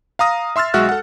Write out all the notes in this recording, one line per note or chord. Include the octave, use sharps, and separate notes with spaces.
F5 A#5 D#6 A#6
E5 C6 E6 F6 A6
B1 G#3 F#4 E5 F6 F#6
A4 F#5